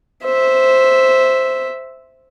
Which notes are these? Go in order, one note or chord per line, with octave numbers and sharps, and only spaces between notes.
C5 E5